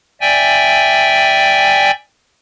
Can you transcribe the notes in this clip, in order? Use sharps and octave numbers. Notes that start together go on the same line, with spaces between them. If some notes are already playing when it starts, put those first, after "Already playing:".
D5 E5 G5 G#5